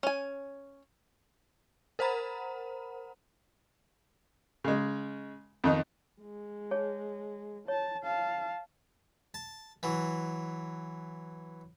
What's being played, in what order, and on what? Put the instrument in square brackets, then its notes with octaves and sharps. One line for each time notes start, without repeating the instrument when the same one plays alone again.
[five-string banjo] C#4 G#5
[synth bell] A#4 C5 F#5 A#5 B5
[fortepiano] C#3 G#3
F2 D#3 D#4
[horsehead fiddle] G#3
[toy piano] G#4 C#5 A5
[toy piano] C#5 [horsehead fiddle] A5
[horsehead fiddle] F5 A5
[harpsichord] A5
E3 F#3